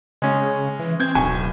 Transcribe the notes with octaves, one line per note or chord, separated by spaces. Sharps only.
C#3 G#3 C#4
E3
C4 G6 G#6
D1 B1 G#5 C#6